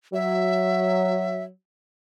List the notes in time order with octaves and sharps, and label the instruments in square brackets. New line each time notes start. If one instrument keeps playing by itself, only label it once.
[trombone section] F#3 [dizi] E5